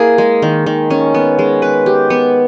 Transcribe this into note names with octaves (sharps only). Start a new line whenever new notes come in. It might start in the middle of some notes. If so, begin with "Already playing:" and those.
Already playing: A#3 E4 G#4
G#3
D#3
D#3
C#4
B3
G#3
B4
G4
B3